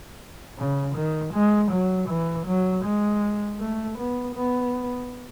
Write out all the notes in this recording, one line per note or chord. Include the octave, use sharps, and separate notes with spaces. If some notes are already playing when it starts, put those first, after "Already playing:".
C#3
D#3
G#3
F#3
E3
F#3
G#3
A3
B3
B3